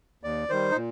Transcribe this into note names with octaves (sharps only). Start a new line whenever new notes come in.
D#2 D5
D#3 G3 C5
D#4
A#2